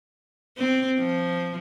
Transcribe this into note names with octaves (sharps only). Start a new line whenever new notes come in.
C4
F3